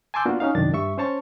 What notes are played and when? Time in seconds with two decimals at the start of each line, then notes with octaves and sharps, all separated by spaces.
0.14 G#5 A5 C6 D6 E6 G6
0.26 A#3 B3 D4 F4 F#4
0.40 C#4 D#4 F5
0.55 C2 F#2 D#3 D4 A6
0.73 G2 E5 C#6
0.98 C#4 C5 C#5 A5 C#6